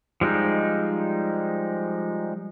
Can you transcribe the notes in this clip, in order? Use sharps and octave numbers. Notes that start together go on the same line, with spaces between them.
F3 G3 G#3 D#4